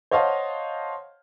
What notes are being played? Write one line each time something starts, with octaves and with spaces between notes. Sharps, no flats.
C5 C#5 D#5 F5 F#5 A5